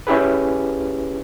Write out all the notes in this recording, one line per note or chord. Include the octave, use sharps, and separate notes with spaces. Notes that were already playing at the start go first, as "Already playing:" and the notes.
C#4 E4 G4 G#4 B4